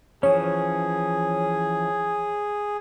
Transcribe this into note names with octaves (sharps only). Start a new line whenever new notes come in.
E3 F3 C#4 G#4 C#5